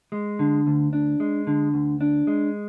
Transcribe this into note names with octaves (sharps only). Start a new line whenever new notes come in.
G#3
D3
D2
D4
G#3
D3
D2
D4
G#3